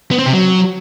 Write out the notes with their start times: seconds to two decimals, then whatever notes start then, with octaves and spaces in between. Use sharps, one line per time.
0.11 B3
0.19 C4
0.26 C3
0.33 F#3